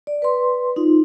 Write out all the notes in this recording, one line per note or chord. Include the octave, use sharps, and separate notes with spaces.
D5
B4 C6
D#4 F4